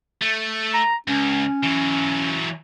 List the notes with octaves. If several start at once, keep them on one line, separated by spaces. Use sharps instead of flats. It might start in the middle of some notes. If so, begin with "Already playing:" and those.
A3
A#5
C#2 C#4
E3 F#3